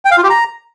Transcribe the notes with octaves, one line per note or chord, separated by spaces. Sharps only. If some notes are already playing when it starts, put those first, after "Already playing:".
G5
F5
F4
G4
A#5